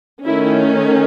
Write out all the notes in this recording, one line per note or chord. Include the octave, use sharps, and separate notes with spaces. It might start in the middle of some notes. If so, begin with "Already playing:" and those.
D#3 A3 C#4 E4